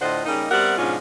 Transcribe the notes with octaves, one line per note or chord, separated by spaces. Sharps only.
A2 D3 F4 C5 D#5 F#5
C#3 G3 A#3 D#4
G3 B3 C4 A#4 E5 F#5
G#2 B2 F3 C#4 D4 F4